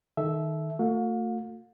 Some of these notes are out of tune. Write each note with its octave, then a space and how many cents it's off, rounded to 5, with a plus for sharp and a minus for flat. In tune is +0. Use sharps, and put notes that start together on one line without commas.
D#3 +0 A4 -25 E5 +0
A3 +35 F#4 -45 F5 +40